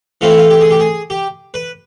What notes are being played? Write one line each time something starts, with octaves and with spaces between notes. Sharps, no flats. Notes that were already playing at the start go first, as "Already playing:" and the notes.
E3 A3 C4 F4
E4
F4
G4
G#4
G4
G#4
G4
B4